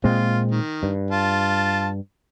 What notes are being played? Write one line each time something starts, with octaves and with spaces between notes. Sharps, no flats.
A#2 G#3 C4 F4
D#3
G2
F4 A5